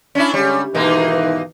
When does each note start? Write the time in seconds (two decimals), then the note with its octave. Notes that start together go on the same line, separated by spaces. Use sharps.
0.15 C#4 D4 E4
0.34 D3 G3 G#3 C#4
0.75 G#2 B2 D#3 E3 A#3 D#4